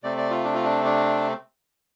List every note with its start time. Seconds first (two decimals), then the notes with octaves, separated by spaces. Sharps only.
0.03 C3 A3 C4 D5
0.17 D5
0.31 F4
0.44 D4
0.54 F4
0.64 D4
0.85 D4